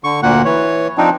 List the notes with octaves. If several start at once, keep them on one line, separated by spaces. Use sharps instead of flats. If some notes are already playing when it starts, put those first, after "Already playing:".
D3 C#6
D2 A#2 A#3 F#5
E3 C#5
F3 C4 D4 D#4